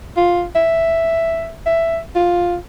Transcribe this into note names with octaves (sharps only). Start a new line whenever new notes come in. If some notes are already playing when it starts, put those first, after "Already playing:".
F4
E5
E5
F4